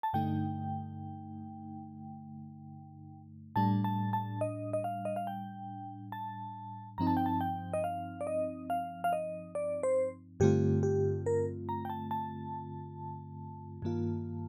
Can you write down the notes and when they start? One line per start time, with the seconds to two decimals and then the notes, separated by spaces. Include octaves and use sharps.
0.03 A5
0.13 G2 D3 A3 D#4 G5
3.56 A2 G3 D4 A5
3.84 A5
4.13 A5
4.41 D#5
4.73 D#5
4.84 F5
5.05 D#5
5.16 F5
5.27 G5
6.12 A5
6.98 G2 F3 C4 D#4 A#5
7.07 A5
7.17 G5
7.26 A5
7.41 G5
7.74 D#5
7.84 F5
8.21 D5
8.27 D#5
8.70 F5
9.04 F5
9.13 D#5
9.55 D5
9.83 C5
10.40 G2 D3 A3 C4 F4 G4
10.83 G4
11.26 A#4
11.69 A#5
11.85 G5
11.90 A5
12.11 A5
13.82 G2 D#3 A#3 F4